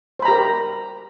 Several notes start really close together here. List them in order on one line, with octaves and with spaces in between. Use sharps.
C5 B5 A#5 G4 A#4